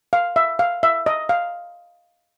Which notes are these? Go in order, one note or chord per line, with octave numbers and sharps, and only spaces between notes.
F5
E5
F5
E5
D#5
F5